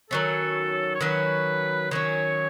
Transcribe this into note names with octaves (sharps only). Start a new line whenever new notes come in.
D#3 F#3 C#4 A4
C#5
D#3 F#3 C#4 B4
D#3 F#3 C#4 C#5